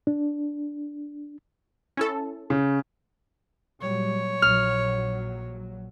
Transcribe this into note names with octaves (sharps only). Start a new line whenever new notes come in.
D4
C#4 E4 A4
C#3
A#2 F#3 G3 C#5
A#1 F#3 F6